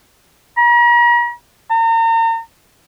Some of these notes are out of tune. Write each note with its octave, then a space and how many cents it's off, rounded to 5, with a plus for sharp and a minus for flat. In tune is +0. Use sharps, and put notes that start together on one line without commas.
A#5 +40
A#5 -40